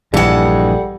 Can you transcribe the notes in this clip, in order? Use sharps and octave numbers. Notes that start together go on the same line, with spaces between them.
A#1 G2 E3 G3 G#3 A4 F#5